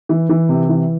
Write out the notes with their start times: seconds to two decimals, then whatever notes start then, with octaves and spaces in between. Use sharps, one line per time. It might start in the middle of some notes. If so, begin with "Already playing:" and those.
0.09 E3
0.29 E3
0.49 C3
0.69 E3